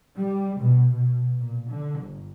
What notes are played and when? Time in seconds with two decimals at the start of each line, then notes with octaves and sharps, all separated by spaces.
0.17 G3
0.60 B2
0.96 B2
1.38 A#2
1.68 D3
2.01 G1